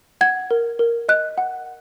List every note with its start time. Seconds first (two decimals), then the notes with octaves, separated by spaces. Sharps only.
0.21 F#5 G#6
0.51 A#4
0.79 A#4
1.09 D#5 F#6
1.38 F#5